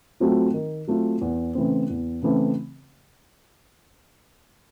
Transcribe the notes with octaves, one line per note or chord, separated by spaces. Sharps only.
F#3 A3 C4 F4
D#3
F#3 A3 C4 F4
E2
C#3 E3 A3 C4
E2
C#3 E3 A3 C4